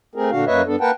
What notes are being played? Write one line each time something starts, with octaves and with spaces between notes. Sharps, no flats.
A3 C4 G#4 A#4
A#2 D3 D4 F#4 F5
F#2 A#3 B4 C#5 D#5 E5
G2 B3 D4 A4
A#3 A#4 B4 F#5 G5 A5